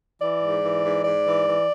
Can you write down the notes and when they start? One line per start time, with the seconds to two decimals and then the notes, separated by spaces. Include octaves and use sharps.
0.21 E3 D5
0.42 G#2
0.63 E3
0.84 G#2
1.05 G#2 D5
1.26 E3
1.47 E3